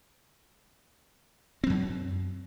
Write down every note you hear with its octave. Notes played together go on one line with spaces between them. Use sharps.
F#2 F#3 C4